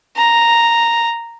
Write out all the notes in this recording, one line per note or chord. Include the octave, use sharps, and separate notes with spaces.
A#5